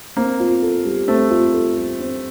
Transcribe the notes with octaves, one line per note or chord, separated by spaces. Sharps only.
A#3 C4
F4
A4
G3
A3 C4
F4
A4
G3
C4